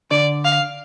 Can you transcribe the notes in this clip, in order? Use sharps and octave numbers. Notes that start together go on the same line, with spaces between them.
D3 D5
F5